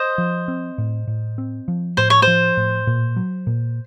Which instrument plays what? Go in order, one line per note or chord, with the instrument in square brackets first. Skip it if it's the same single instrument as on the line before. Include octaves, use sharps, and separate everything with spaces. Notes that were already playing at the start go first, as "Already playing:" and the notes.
Already playing: [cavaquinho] C5 D#5
[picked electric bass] F3
C4
A2
A2
C4
F3
[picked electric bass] A2 [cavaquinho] C5
[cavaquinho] C#5
C5
[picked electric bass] F3
A2
A#2
F#3
A#2